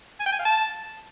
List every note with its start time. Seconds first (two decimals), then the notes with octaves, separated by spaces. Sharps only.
0.20 G#5
0.26 G5
0.32 G#5
0.39 F5
0.45 A5